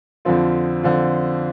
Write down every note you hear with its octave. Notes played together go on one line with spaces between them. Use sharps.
F2 D3 F3 C4 F4
F2 D3 F3 C4 F4